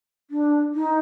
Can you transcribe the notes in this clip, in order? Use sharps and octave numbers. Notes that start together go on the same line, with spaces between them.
D4
D#4